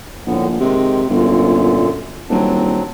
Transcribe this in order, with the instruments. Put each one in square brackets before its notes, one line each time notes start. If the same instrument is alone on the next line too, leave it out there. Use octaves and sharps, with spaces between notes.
[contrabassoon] A#1 [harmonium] A2 D3 B3
[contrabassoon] C3 [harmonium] D#3 G#3
[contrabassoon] G1 [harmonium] F#2 A#2 D3
[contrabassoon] D#1 [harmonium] F#3 C4 D4